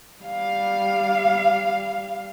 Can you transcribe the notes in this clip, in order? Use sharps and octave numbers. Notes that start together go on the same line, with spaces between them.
G3 F5